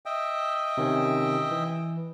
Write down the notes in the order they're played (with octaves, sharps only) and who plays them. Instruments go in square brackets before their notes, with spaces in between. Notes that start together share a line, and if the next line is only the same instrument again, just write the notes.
[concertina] D#5 E5 G5
[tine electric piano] C3 D#3 C#4
E3